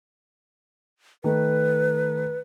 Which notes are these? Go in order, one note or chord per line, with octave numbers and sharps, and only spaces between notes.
D#3 A3 B4